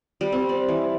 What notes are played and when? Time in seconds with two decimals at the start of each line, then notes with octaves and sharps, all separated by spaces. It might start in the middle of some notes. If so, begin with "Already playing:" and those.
0.21 G3
0.32 C4
0.49 D5
0.69 E3